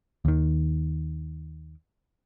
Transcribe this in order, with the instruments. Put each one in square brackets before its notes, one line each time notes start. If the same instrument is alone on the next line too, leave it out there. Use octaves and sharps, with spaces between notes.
[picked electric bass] D#2 D#3